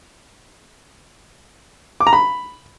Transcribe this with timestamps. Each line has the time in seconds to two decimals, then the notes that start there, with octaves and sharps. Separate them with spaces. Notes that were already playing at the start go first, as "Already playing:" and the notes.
2.00 D6
2.07 A#5
2.13 B5